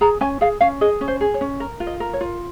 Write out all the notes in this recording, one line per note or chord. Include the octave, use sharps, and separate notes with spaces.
G#4 A#5
C#4 G#5
G#4 F5
C#4 F5
G#4 D#5
C#4
C5
G#4
C#5
C#4
A#4
F4
D#5
A#4
C#5
F4